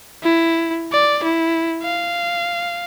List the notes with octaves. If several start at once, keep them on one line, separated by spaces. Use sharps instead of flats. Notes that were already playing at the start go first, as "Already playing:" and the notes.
E4
D5
E4
F5